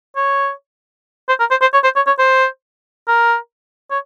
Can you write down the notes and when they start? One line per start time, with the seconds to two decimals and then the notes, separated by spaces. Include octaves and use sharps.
0.16 C#5
1.29 C5
1.40 A#4
1.51 C5
1.61 C5
1.73 C#5
1.84 C5
1.96 C#5
2.07 C#5
2.18 C5
3.08 A#4
3.91 C#5